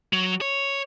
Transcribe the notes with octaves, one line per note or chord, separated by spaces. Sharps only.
F#3
C#5